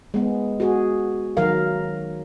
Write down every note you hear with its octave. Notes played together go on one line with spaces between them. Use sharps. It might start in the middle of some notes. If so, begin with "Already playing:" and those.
G#3 B3
F#4 G#4
D#3 F#3 A#4 F5